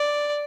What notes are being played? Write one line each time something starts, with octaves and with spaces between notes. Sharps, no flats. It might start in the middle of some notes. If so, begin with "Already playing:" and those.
Already playing: D5